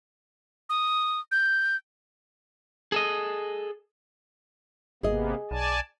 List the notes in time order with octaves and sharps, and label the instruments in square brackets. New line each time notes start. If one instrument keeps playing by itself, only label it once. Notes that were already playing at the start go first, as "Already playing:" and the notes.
[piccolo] D#6
G6
[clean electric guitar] G#4 A4 D#5
[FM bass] G#1 [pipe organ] C3 A#3 B3 [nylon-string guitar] G#4 D#5
[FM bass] B1 [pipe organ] D5 G#5 A5